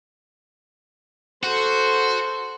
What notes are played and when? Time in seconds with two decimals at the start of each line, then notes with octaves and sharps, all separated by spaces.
1.43 F#4 A4 C5